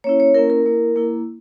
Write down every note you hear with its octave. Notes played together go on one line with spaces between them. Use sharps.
A#3 C#4 E4 C#5
C#5
A#3 C#4 E4 A#4
A#4
A#3 E4
A#3 E4